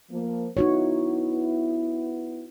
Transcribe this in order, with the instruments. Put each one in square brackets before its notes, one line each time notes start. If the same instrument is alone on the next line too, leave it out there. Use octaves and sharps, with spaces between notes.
[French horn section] F3 A#3
[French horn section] B3 E4 [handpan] D#4 F#4 C#5